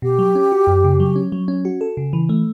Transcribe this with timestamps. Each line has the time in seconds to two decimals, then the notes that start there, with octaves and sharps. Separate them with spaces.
0.02 B2 G4
0.19 F#3
0.35 C#4
0.52 F#4
0.67 F#2
0.84 C#3
1.00 F#3
1.16 C#4
1.32 F#3
1.48 C#4
1.65 F#4
1.81 A4
1.97 C#3
2.13 E3
2.29 A3